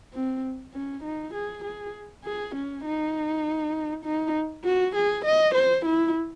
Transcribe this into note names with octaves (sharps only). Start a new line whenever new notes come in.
C4
C#4
D#4
G#4
G#4
G#4
C#4
D#4
D#4
F#4
G#4
D#5
C5
E4